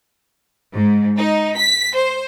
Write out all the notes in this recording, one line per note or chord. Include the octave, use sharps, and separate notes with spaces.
G#2
D#4
B6
C5